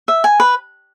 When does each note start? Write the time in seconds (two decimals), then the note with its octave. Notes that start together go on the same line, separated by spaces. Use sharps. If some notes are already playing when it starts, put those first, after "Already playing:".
0.08 E5
0.24 G#5
0.40 B4